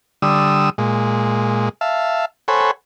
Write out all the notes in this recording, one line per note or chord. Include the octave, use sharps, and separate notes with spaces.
D3 G3 D#6 E6
A#2 G#3
E5 F5 A5
A4 C5 C#5 F#5 G#5 B5